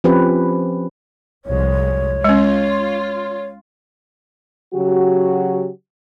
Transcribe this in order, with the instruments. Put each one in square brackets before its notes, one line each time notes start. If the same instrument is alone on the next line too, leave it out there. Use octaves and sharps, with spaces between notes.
[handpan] F3 C4 C#4 G4 B4
[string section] C2 F2 G#3 [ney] C#5
[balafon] G#3 C#4 [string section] F4
[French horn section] C#3 F#3 F#4 G4